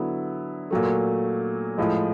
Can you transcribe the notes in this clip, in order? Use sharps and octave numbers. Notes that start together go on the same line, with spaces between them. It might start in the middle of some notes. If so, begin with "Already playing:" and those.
Already playing: D3 F#3 B3 E4
A#2 F#3 A3
A2 F3 G#3